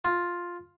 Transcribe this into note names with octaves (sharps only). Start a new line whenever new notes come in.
F4